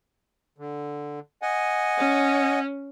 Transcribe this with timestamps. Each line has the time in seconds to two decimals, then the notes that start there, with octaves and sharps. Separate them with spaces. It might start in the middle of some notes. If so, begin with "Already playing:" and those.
0.58 D3
1.42 D#5 F#5 G#5
1.97 C#4